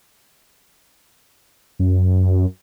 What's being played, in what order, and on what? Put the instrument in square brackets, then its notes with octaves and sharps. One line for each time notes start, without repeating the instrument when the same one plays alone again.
[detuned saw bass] F#2